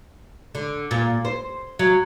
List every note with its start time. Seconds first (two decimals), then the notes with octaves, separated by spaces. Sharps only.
0.55 D3
0.91 A#2
1.25 C5
1.79 F#3